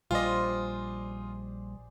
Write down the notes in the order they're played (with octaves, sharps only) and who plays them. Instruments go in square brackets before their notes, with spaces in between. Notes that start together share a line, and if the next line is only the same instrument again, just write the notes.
[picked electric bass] A#1 G3 [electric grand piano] F4 D#5 [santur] G#4 C5 D5